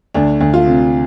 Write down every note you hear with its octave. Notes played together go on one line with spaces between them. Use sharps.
D2 D4
D2
F4
C3